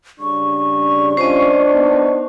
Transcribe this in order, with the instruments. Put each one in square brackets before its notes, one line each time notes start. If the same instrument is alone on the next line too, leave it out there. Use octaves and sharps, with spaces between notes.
[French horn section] C#3 G3 D4 [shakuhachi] C#6
[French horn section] G2 C#4 F4 [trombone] D4 [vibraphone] C5 D#5
[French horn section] B3 D#4